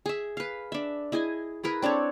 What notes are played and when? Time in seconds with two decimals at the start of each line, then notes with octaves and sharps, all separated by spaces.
0.06 G#4 E5
0.37 B4 F5
0.72 D4 E5
1.12 E4 G#4 D#5 G#5
1.63 E4 G#4 A#4 B4
1.82 C4 D4 A4 C#5